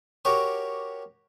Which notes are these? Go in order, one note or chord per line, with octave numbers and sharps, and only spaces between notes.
F#4 G4 A#4 C#5 D6 D#6